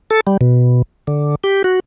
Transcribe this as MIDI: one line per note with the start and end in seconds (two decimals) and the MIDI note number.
0.11 0.20 69
0.27 0.37 55
0.41 0.82 47
1.07 1.35 50
1.44 1.62 67
1.64 1.80 66